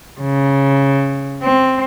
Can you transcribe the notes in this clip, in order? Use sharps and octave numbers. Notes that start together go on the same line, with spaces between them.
C#3
C4